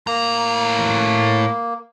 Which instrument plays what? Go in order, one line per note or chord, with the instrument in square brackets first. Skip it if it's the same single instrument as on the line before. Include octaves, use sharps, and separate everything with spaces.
[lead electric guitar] A2 A#5 [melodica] A#3